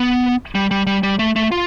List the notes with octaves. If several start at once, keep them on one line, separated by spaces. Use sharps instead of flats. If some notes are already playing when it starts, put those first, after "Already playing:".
Already playing: B3
G3
G3
G3
G3
A3
A3
F4